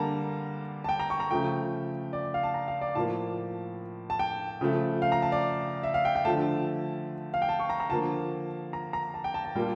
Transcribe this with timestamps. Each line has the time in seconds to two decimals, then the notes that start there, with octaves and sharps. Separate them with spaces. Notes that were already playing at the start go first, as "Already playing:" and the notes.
Already playing: D3 G3 A#3 A5 A#5
0.84 A5
0.89 G5
1.00 A#5
1.10 C#6
1.20 A#5
1.31 C#3 F3 A3 G5
2.13 D5
2.34 F5
2.43 A5
2.54 A#5
2.68 F5
2.81 D5
2.95 A2 F3 A#3 A5
4.10 A5
4.19 G5
4.61 C#3 F3 A3
5.02 F5
5.12 A#5
5.22 A5
5.32 D5
5.83 E5
5.94 F5
6.05 G5
6.15 G5
6.25 D3 F3 A3 A5
7.34 F5
7.42 G5
7.49 A5
7.60 C#6
7.70 A#5
7.80 A#5
7.90 D3 F3 A#3 A5
8.73 A#5
8.93 A#5
9.14 A5
9.24 G5
9.34 A5
9.45 A5
9.55 A#2 G3 A#3 G5